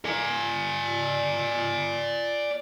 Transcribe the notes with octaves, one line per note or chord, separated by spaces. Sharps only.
D5 G#5